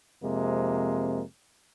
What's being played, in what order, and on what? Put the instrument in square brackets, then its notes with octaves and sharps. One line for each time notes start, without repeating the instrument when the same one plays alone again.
[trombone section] F2 C3 G#3 A#3